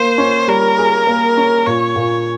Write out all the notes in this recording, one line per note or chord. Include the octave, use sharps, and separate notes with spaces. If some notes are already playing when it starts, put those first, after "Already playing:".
Already playing: A#3 C5
C#4
G3 A#4
G#4
A#3
C#4
A#2 C#5
A#2